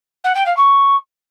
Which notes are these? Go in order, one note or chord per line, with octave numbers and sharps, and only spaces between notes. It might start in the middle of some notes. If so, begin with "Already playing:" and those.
F#5
G5
F5
C#6